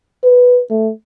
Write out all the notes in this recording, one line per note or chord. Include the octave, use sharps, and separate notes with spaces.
B4
A3